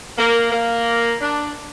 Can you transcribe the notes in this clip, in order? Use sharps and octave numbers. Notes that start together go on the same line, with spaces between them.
A#3
A#3
D4